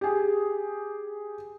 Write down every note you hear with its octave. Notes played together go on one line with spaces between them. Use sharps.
G4 G#4